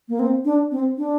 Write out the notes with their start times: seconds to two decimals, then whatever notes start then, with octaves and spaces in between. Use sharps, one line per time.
0.09 A#3
0.19 C4
0.45 D4
0.71 C4
0.98 D4